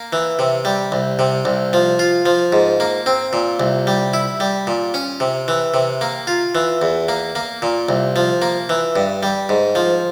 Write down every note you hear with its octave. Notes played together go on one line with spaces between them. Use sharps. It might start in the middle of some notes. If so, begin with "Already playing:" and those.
Already playing: A#3
E3
C3
G3
C2
C3
C2
F3
F4
F3
G#2
A#3
C4
A#2
C2
G3
E4
G3
A#2
C#4
C3
E3
C3
A#3
F4
E3
E2
A#3
A#3
A#2
C2
F3
A#3
E3
G2
G3
G#2
F3